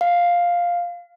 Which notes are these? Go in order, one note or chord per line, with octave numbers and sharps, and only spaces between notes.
F5